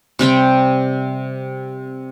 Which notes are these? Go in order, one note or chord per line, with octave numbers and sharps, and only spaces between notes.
C3 G3 C4 G5